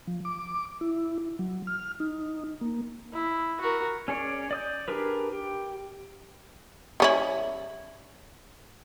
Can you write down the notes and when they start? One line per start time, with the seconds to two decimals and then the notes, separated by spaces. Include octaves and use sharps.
0.07 F3
0.25 D6
0.81 E4
1.39 F#3
1.67 F6
2.00 D#4
2.61 A#3
3.13 E4
3.60 F#4 A#4
4.08 C#4 G#4 C#5 D5
4.51 D5 D#6 G6
4.88 D4 G4 G#4 A#4 B4
5.33 G4
7.00 G3 C#4 E4